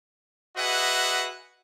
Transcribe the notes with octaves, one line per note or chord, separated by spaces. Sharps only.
F#4 G#4 B4 D#5 E5 F#5